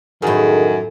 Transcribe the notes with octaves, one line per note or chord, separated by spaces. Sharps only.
F#2 A2 D#3 F3 G#4